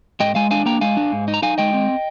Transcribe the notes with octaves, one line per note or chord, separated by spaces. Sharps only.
G#2 D#5 G5
G#3 F5 G#5
D4 F5 G#5
A#3 G5 A#5
G#3 F5 G#5
D4
G#2
D#4
A#5
D#4 F5 G#5
G#3 D#5 G5
C4